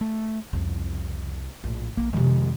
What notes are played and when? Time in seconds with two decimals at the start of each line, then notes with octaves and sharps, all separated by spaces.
0.01 A3
0.53 C2 F2 C#3
1.64 A#1 A2
1.97 A#1 A#3 E4
2.13 F2 C3 D#3 F3 G#3